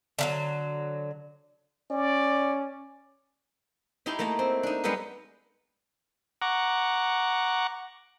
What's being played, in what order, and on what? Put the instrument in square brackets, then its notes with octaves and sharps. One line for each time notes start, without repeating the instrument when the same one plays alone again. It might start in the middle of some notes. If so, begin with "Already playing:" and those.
[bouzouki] D3 F3 F#3
[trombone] C#4 [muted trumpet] D5
[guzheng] D#4 E4 G4 A5 C6
A3 A#3 A5 A#5
C4
D4 D#4
G3 G#3 B3 D#4 G4 A4
[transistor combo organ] F#5 A#5 C#6 D6